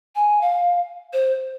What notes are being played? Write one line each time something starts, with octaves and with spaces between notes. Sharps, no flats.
G#5
F5
C5